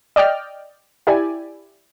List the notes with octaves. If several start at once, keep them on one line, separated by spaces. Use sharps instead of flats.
D5 D#5 G5 F6
E4 G4 D5 G#5